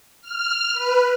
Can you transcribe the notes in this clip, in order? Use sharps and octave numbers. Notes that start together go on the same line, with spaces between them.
F6
B4